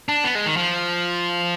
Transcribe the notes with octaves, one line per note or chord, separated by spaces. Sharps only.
D4
B3
G#3
D#3
F3